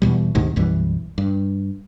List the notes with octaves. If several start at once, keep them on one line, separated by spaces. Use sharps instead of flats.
E2 B2 G3
D2 G#2 C3 D#3
B1 F#2 E3 G3
G2